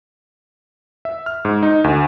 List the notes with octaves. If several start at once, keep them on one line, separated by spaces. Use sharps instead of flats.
E5
F6
G#2
D#4
D2